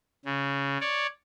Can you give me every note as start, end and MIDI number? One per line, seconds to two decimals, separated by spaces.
0.25 0.77 49
0.81 1.07 73
0.81 1.07 74